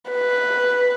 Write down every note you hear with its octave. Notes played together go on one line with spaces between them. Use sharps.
B4